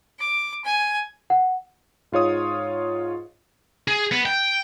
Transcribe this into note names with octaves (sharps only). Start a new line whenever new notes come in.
D6
G#5
F#5
G#2 F4 C#5 D#6
G#4
B3
G5